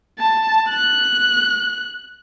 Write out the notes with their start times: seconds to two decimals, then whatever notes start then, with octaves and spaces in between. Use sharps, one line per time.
0.19 A5
0.69 F#6